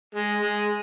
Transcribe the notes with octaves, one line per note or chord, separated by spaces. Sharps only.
G#3
G#3